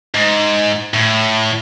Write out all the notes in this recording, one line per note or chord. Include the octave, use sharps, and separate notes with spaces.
G#2
A2